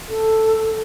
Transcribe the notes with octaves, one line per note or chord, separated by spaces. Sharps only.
A4